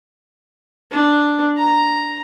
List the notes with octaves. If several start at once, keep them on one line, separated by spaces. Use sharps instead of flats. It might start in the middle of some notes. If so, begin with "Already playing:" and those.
D4
A#5